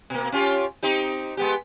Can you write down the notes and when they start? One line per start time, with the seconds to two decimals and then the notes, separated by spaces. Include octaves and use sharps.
0.10 B2 A#3
0.32 C#4 F4 G4
0.83 C4 D#4 G4
1.37 G#3 B3 G4